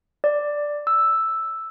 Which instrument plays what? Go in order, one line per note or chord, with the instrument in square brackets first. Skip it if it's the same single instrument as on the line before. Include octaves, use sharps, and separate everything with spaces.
[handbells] D5
E6